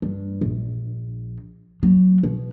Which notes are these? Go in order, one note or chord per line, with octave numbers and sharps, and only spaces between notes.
G2
A#1
F#3
B2